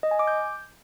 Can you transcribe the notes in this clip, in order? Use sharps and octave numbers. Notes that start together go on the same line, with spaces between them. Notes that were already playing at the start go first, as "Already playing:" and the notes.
D#5
G#5
D6
G6